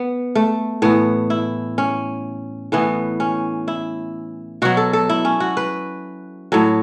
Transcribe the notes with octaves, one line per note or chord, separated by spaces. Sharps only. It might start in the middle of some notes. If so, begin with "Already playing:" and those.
Already playing: B3
A3
A2 E3 B3
E4
C#4
A2 E3 B3
C#4
E4
B2 F#3 F#4
A4
A4
E4
C#4
F#4
B4
A2 F#3 A4